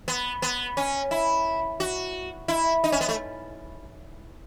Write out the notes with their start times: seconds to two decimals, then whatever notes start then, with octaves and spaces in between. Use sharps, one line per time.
0.08 B3
0.42 B3
0.77 C#4
1.11 E4
1.80 F#4
2.48 E4
2.84 D#4
2.92 C#4
3.01 B3
3.09 A3